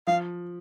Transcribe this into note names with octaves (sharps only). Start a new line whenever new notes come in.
F3 F5